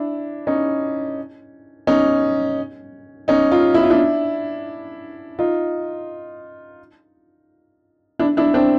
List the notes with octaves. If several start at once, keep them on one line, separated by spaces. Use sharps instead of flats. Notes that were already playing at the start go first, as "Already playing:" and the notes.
Already playing: D4 E4
C#4 D#4
C#4 D#4
C#4 D#4
D#4 F4
E4
F4
D4 E4
D#4 F4
D4 E4
D4 E4
C4 D4